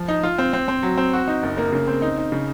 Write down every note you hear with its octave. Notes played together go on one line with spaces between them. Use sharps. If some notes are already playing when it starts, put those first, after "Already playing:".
Already playing: F3
D#4
F4
C4
C4
C4
F#3
C4
F#4
D#4
F#1
A#3
C#3
C4
D#4
D#4
C#3